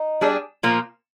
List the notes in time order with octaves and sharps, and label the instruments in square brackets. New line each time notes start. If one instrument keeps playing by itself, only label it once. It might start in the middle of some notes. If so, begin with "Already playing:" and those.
Already playing: [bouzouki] D#4
[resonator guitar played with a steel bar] G3 D4 G#4
A#2 F3 A#3 F4